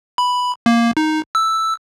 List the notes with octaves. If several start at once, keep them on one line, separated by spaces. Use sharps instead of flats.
B5
A#3
D#4
E6